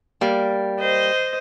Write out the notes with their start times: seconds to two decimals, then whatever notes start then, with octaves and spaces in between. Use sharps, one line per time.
0.21 G3 A#3
0.80 C5 D#5